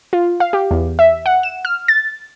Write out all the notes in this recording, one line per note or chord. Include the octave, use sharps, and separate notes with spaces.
F4
F5
G4
E2
E5
F#5
E7
F6
A6